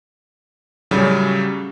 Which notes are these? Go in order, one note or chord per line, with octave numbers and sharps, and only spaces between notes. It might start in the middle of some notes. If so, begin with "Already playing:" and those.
A2 C#3 F#3 G3